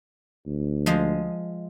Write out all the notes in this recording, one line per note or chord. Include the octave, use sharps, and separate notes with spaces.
D2
F3 G#3 D#5